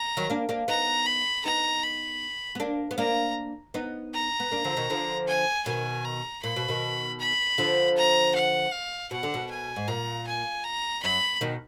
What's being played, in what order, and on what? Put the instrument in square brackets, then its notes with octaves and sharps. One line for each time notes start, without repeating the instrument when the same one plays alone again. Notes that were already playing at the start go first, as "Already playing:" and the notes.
Already playing: [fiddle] A#5
[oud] D#3 F#3
A#3 D4
A#3 D4
[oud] B3 D#4 [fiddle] A#5
[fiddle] B5
[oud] B3 D#4 [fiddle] A#5
[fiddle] B5
[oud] B3
A#3 D4
B3
[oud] A#3 D4 [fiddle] A#5
[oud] B3 D#4
[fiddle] A#5
[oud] B3
A#3 D4
D3 F3
B2 D#3
D3 F3
[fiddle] G#5
[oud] B2 D#3 [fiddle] G#5
[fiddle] A#5
[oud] A#2 [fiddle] B5
[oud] B2
B2 D#3
[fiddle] B5
[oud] D3 F3
[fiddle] A#5
F#5
F5
[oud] B2 [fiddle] F#5
[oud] D3
B2
[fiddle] G#5
[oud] G#2
[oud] A#2 [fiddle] A#5
[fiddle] G#5
A#5
[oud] F#2 [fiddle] B5
[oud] B2 D#3